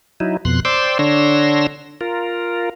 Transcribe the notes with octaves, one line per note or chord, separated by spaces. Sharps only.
F#3 D#4 E4
F2 B2 C6 F#6
C5 D5 G5 C6 D6 E6
D3 D4 C#5 C6 E6 A#6
F4 A#4